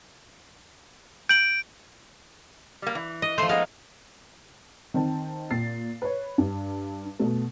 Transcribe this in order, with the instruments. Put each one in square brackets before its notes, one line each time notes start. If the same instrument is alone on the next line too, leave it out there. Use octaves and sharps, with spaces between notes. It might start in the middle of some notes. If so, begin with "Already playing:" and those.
[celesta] G6 F#7 [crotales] D7
[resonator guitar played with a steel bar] G3 A#3
E3
[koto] D#5
[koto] F3 A3 [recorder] C6
[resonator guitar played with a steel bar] G#3 B3 D#4 [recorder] D#5 [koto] F5
[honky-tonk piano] D#3 C4 A5
A#2 A6 C7
B4 C#5
G2
B2 A3